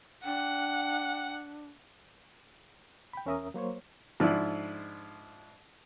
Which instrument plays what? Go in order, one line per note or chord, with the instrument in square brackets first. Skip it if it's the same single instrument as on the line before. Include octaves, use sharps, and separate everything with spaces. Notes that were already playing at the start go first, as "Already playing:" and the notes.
[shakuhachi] D4 [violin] F#5 [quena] G5
[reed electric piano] G5 B5
E2 C#4 A#4 E5 A#5 D#6
F#3 A#3 C5 C#5
[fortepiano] G#2 F3 D4 E4